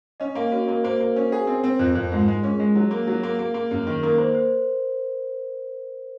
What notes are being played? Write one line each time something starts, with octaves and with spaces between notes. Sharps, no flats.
C#4 D#5
A#3 F5
C#4 F#4
A#3 A#4
A#3 C5
A#3
C#4 A#4
G#4
C4
C4
F2
F2
G#2 F4
G#3
C#4 G#4
G#3
F#3
A#3
F#3
A#3
A#3
A#3
F#2
D#3
A#3 A#4
A#3 C5
C5